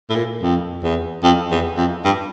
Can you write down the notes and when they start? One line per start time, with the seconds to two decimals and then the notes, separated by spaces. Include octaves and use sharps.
0.09 A2
0.15 A#2
0.42 F2
0.83 E2
1.23 F2
1.51 E2
1.77 F2
2.05 G2